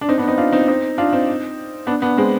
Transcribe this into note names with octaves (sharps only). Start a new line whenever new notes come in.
D4
C4 D#4
B3 D4
C4 D#4
D4 F4
C4 D#4
C4 D#4
D4 F4
C4 D#4
B3 D4
B3 D4
G#3 C4